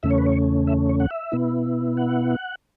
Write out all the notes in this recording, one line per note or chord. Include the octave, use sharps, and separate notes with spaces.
E2 C#3 A3 C#4 E5
C#5
B4
C#5
E5
C#5
F#5
E5
B2 B3 E4
F#5